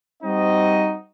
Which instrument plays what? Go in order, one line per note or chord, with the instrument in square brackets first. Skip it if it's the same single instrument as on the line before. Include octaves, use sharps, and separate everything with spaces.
[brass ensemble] G3 C4 D#4 F#4 D#5